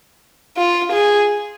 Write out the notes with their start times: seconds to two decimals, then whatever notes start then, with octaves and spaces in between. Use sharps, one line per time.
0.58 F4
0.93 G#4